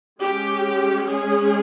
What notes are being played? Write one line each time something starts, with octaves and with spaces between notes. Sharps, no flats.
G#3 C#4 G4
G#4